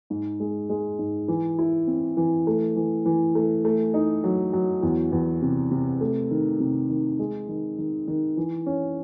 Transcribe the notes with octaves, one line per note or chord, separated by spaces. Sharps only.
G#2
G#3
G#3
G#2
E3
E4
C4
E3
A3
E3
E3
A3
A3
D#4
F#3
F#3
E2
E2
C3
C3
A3
D#3
C3
D#3
G#3
D#3
D#3
D#3
E3
C#4